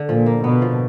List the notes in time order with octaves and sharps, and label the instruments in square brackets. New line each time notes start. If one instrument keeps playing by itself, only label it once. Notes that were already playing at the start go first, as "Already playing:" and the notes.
Already playing: [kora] D3
[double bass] A#2 [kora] F3
[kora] A#3
[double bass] B2 [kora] B3
[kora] F3